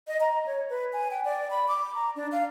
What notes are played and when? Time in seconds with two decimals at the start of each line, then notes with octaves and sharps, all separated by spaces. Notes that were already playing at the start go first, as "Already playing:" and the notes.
0.08 D#5
0.21 A#5
0.46 C#5
0.70 B4
0.93 G#5
1.11 G5
1.25 D5
1.50 B5
1.68 D6
1.95 A#5
2.16 D4
2.32 F5